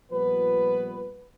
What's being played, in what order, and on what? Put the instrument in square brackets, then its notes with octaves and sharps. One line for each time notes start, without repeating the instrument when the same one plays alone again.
[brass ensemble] A#2 F3 G3 B3 B4